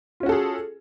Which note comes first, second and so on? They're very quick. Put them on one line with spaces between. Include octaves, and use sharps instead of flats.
F4 C#4 F#4 A4 G#4